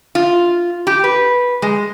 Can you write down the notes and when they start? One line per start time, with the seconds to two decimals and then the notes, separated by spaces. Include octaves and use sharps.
0.15 F4
0.87 G4
1.04 B4
1.62 G#3